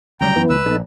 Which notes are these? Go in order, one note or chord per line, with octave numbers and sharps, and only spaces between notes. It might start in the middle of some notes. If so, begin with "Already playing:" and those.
D2 C#3 F#3 G3 G5 A#5
F#2 E3 B3
C#2 B4 E6
A#1 B3 D#4 A4